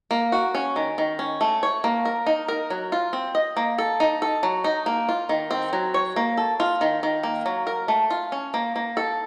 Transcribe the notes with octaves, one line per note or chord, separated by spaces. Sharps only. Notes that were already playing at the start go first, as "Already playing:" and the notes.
A#3
F#4
C#4
D#3
D#3
C#4
A3
C#5
A#3
A#4
D#4
A#4
F#3
F4
C4
D#5
A#3
A4
D#4
A4
F#3
D#4
A#3
F4
D#3
C4
F#3
C#5
A#3
A4
F4
D#3
D#3
A#3
F#3
A#4
A3
F4
C#4
A#3
A#3
A4